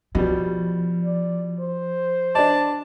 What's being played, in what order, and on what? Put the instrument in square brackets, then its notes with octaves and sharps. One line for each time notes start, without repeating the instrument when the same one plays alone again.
[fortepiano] B2 G3 [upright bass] F3
[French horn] D5
C5
[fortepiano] D4 D5 [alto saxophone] A5